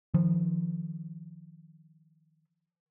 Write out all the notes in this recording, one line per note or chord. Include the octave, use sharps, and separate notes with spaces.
D#3 F3